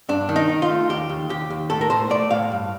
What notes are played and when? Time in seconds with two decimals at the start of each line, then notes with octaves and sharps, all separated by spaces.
0.09 G2 D4
0.29 D#3
0.36 D#4
0.49 D#3
0.62 F4
0.70 A3
0.89 D#2 G4
1.09 D#2
1.29 D#2 G4
1.50 D#2
1.70 A2 A4
1.81 A#4
1.90 A2 C5
2.10 A3 D5
2.31 A2 F5
2.52 G2